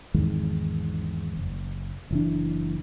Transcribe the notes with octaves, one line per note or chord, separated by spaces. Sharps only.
G#1 E2 D#3 G#3
F#1
F#1 E3 D4